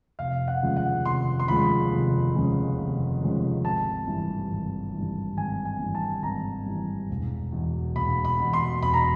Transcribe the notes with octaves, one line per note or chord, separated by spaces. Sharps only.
F1 F5
F#5
D#2 C#3 F3 G#3
F#5
F1 C6
C6
D#2 C#3 F3 G#3 B5
F1
D#2 C#3 F3 G#3
F1
D#2 C#3 F3 G#3
G#1 A5
G2 E3
G#1
G2 E3
G#1 G#5
G#5
G2 E3
A5
G#1 A#5
G2 E3
E1
E2 B2
E1 B5
B5
E2 B2
C6
E1 B5
A#5